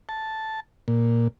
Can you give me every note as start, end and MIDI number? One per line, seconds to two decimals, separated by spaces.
0.09 0.60 81
0.88 1.28 46